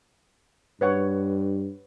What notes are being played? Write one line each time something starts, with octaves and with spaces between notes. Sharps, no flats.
G2 B4 C#5 F#5